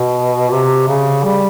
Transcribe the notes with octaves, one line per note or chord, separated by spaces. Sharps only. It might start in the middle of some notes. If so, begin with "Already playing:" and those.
Already playing: B2
C3
C#3
G3